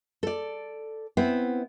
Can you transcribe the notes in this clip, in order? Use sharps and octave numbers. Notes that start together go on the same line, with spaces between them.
A4 D5
B3 C4 E4